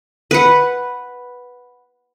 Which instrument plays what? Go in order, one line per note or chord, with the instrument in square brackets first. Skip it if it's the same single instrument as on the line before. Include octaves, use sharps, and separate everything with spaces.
[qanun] B4 F#5